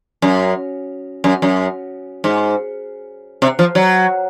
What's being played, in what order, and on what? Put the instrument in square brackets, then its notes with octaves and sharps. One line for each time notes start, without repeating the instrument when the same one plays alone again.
[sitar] F#2
F#2
F#2
G#2
C3
F3
F#3